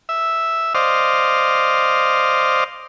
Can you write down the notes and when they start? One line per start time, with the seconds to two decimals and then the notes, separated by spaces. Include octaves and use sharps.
0.09 E5
0.74 C5 D5 D#5 F5